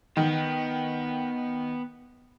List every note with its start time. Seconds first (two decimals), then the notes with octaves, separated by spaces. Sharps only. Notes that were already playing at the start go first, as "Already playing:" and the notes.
0.17 D#3 B3